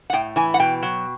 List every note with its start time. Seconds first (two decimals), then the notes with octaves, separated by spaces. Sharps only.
0.10 F#5
0.13 A2 G5
0.36 E3 G#5
0.54 F#5
0.60 B2 G5
0.83 F#3